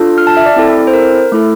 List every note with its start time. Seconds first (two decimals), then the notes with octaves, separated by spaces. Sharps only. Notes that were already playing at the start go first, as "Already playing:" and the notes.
Already playing: D4 F4 A4
0.18 F6
0.27 A5
0.37 E5
0.46 D5
0.56 C4 E4 A4
0.87 C5
0.94 A#4
1.32 A3 E4 A4